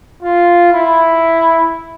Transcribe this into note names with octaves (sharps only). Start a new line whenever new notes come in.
F4
E4